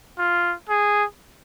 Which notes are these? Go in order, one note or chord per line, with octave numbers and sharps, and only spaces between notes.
F4
G#4